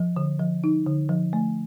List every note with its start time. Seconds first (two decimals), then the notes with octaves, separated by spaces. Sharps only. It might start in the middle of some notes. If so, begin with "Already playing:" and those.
Already playing: F3
0.16 D3
0.39 F3
0.64 D#4
0.87 D3
1.09 F3
1.33 A3